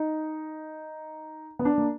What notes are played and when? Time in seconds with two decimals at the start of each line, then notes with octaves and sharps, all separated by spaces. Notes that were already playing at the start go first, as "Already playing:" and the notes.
Already playing: D#4
1.59 B3
1.65 D4
1.78 A#3